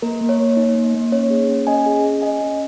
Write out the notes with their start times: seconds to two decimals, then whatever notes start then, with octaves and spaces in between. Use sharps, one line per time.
0.02 A#3 A#4
0.21 A#3
0.29 C#5
0.39 A#3
0.57 D#4
0.75 A#3
0.94 A#3
1.12 C#4 C#5
1.30 G#4
1.49 C#4
1.67 C#4 D#5 G#5
1.86 G#4
2.04 C#4
2.22 C#4 D#5 G#5
2.41 C#4